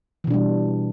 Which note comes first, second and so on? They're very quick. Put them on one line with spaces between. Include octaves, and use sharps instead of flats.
E3 B2 D4 G3